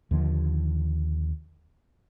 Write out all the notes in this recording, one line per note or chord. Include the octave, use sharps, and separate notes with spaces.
D#2 D3 F3